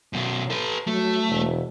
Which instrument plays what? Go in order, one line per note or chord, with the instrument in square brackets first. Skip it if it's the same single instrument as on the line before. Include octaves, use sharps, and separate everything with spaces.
[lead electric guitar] F#2 B2
A4 B4
[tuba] F#3 [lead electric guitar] A3
[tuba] E1